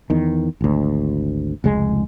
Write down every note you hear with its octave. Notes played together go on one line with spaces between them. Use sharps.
E2 D#3
G#1 D2
F1 C#2 G#3